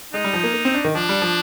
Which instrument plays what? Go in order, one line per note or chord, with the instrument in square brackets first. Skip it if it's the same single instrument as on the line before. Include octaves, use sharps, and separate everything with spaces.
[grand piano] G#3 [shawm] D#4
[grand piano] G3
F3
A#3
A#3
C4
D4
D#3
[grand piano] F3 [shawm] D4
[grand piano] G3
F3